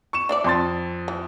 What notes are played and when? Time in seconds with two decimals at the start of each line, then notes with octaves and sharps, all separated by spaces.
0.13 C#6 E7
0.29 D4 E4 D5
0.44 F2 C6 A6
1.08 E3